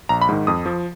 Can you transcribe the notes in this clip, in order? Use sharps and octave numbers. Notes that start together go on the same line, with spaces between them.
A#1 A#5
B5
G#2 D#3
F2 D#6
F3